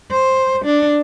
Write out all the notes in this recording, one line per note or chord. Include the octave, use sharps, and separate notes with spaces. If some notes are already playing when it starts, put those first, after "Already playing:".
C5
D4